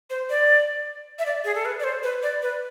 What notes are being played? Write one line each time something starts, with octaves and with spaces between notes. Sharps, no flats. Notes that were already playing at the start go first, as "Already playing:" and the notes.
C5
D5
E5
D5
G#4
A4
B4
D5
C5
B4
D5
B4